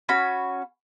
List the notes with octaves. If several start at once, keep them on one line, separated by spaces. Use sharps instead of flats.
C#4 F#4 B5